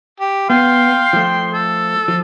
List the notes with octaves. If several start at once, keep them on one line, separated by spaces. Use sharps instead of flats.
G4
B3 F5 G5 C6
F3 A3
A4
F3